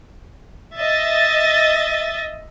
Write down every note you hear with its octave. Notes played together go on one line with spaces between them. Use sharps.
D#5 E5 A6